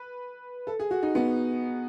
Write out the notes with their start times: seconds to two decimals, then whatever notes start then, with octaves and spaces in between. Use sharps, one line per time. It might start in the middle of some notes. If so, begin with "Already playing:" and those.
Already playing: B4
0.67 A4
0.79 G#4
0.91 F#4
1.03 D#4
1.15 B3